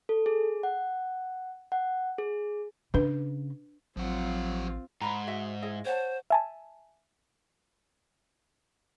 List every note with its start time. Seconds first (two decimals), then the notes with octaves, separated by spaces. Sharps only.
0.09 A4
0.26 G#4
0.63 F#5
1.72 F#5
2.18 G#4
2.94 C#3 D4 B4
3.97 A1 F3 F#3 C4 F4 F#5
5.01 G#2 A#5 B5
5.27 F#4 D#5 E5
5.62 E4 G#4 D#5
5.85 C5 C#5 F#5 A5
6.30 E5 G#5 A5